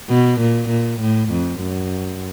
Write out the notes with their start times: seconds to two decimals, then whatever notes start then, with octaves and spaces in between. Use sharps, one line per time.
0.10 B2
0.41 A#2
0.70 A#2
1.01 A2
1.31 F2
1.60 F#2